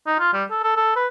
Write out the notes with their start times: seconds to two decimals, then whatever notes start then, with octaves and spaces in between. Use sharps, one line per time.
0.07 D#4
0.19 F4
0.34 G3
0.51 A4
0.64 A4
0.77 A4
0.96 B4